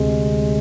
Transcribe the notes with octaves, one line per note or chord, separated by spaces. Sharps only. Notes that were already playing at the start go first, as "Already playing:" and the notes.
Already playing: D2 C3 G#3